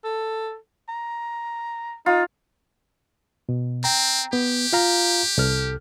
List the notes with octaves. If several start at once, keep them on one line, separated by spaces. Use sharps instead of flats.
A4
A#5
D#4 F4
B2
C4 G5 A#5
B3 G4
F4 F5 A#5
C2 A4 F6